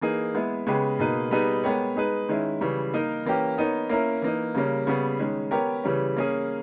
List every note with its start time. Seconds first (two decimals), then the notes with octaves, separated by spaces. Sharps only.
0.01 E3 A#3 D#4 G#4
0.35 G#3 B3 E4
0.67 C#3 G#3 B3 G4 B4
0.99 B2 A#3 D#4 G#4 B4
1.31 G3 B3 D#4 G#4 B4
1.64 G#3 B3 G4 A#4 C#5
1.96 G#3 D#4 G#4 B4
2.29 D#3 G#3 C#4 E4
2.61 C#3 E3 G3
2.94 A#3 D#4 A#4
3.26 E3 A#3 C#4 G4
3.58 B3 D#4 A#4 C#5
3.89 A#3 C#4 E4 A#4
4.22 E3 A#3 D#4
4.55 C#3 G3 A#3 C#4
4.87 C#3 G3 B3
5.19 D#3 G#3 C#4
5.51 B3 G4 A#4 C#5
5.84 C#3 E3 G3 C#4
6.17 A#3 C#4 G#4